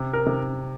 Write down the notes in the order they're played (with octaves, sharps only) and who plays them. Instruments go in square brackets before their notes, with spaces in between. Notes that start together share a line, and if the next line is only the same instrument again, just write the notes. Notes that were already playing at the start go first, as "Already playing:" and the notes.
Already playing: [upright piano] C3
[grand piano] A#4
[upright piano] C3